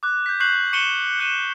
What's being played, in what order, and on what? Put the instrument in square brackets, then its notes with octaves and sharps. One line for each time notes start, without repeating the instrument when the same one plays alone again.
[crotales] D6 F#6
G6 B6
C#6 F#6 G6 C7 F#7
C#6 C#7 D#7 E7 F#7 G7
F#6 D#7 E7